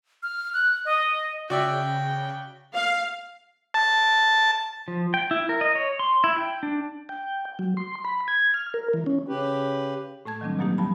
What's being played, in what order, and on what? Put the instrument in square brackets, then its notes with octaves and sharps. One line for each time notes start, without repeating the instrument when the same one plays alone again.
[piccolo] F6
F#6
D#5
[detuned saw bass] C#3 [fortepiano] F#4 D5 E5 [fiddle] G5
[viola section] F5
[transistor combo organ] A5
[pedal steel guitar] F3
G5
E4
A#4
D#5
C#5
C6
E4
G5
D4
[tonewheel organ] G5
F#3
C6
B5
G#6
F6
A#4
E3
C#4
[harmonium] C#3 G4 B4
[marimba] A2 A3 A5 G#6
D#3 F#3 G3 C4 D4
B2 F3 F#3 A#3 D#4 G4
E2 F3 G3 A5 B5